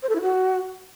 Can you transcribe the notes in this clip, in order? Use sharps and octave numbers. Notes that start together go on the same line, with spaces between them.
C5
A4
E4
F#4